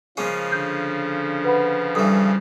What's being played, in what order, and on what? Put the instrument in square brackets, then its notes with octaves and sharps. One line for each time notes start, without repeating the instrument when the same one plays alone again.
[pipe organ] C#3 F3 [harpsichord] G#3 A#3 C#4
[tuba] D3 [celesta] G6
[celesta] B4 F#5 B5
[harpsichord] G2 E3 [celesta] A4 D#6